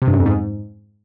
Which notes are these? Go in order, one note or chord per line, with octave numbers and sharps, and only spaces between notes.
C3
G2
F#2
F2
G#2